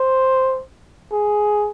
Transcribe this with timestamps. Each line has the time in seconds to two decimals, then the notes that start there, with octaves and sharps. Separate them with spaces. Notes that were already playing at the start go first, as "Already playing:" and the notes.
Already playing: C5
1.12 G#4